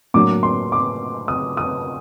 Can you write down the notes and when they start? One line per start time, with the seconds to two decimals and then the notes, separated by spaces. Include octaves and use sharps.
0.14 A2 F#3 A#3 D4 D6
0.43 C6
0.72 D6
1.28 D#6
1.57 D#6